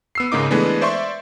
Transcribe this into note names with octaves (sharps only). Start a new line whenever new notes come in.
B3 E6 C7
G#2 C#3 A#3 D#4 D6
E3 G#3 A3 B3 D4
C5 D5 E5 C6 C#6